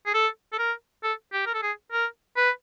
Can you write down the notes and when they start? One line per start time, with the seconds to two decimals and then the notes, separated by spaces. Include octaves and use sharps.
0.06 G#4
0.14 A4
0.52 A4
0.59 A#4
1.04 A4
1.33 G4
1.46 A#4
1.54 A4
1.63 G#4
1.92 A#4
2.37 B4